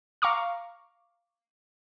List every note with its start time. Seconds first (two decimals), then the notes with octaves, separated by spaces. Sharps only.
0.22 F5 A#5 C#6 D6 F6